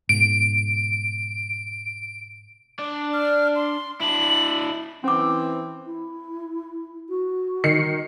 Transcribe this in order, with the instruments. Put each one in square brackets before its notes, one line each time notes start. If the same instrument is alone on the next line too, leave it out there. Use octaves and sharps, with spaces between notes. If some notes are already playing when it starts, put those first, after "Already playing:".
[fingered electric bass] G#2 B2 [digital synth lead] D7
[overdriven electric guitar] D4 D5
[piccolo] F6
C6
[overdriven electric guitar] D4 E4 [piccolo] F#7
[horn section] E3 C4 [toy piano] C#4 D6
[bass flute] E4
F#4
[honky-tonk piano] D#3 C7 C#7